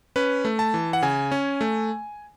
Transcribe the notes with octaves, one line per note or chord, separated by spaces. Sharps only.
C#4 B4
A3
A5
E3
F#5
C#3 G#5
C#4
A3